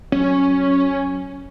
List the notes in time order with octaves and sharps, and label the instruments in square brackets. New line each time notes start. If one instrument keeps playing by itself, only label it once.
[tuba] F#3 [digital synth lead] C#4